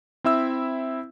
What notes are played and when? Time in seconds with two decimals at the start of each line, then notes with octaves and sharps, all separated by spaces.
0.24 C4 E4 E5 E6